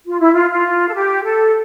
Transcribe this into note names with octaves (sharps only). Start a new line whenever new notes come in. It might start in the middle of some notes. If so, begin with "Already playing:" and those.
F4
E4
F4
F4
A4
G4
A4